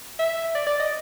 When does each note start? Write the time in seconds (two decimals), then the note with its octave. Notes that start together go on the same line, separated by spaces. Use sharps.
0.19 E5
0.55 D5
0.67 D5
0.80 D#5